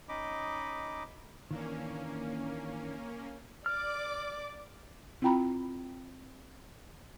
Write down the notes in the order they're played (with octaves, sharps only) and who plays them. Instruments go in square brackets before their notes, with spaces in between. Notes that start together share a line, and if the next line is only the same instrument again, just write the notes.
[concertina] C#4 D#4 D#5 B5 D6
[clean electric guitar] D#3 E3 D4 [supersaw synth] A#3 C#4
[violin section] D5 D6 [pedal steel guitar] F6
[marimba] C4 E4 F4 G5 A#5 B5